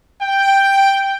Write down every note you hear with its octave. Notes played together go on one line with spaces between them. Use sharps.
G5